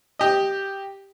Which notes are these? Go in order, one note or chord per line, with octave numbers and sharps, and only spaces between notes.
G4 D#5